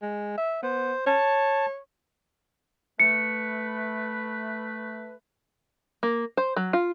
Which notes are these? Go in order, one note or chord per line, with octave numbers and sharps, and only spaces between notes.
G#3
E5
B3 C5
C#5 A5
A3 B4 C#7
A#3
C5
F#3
F4